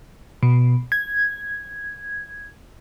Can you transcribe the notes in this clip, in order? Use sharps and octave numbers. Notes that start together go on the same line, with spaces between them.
B2
G#6